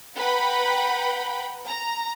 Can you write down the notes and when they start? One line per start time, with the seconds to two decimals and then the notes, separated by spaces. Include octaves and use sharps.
0.17 B4 F#5 G5 A#5 B5
1.69 A#5